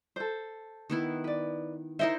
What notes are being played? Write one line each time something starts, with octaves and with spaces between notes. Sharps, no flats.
A4 C5
D#3 B3 E4
B4 D5
D#4 E4 A#4 C5 D#5 E5